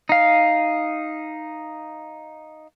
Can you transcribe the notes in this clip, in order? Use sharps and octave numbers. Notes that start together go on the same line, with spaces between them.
D#4 F5